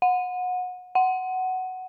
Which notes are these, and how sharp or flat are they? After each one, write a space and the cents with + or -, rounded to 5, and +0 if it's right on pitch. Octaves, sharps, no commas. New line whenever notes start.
F#5 -25
F#5 +10